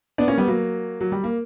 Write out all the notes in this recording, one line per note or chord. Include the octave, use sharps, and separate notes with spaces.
B3 D4
A#3 C#4
G3 B3
F#3 A#3
F#3
G3
A#3